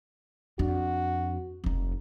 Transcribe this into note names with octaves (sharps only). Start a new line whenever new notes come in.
F2 D4 F#4
F1 D#4